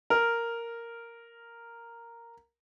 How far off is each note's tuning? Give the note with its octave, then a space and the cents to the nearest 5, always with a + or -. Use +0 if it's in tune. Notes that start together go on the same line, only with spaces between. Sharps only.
A#4 -5